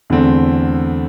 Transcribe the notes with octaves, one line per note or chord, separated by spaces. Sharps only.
E2 D3 A3 C4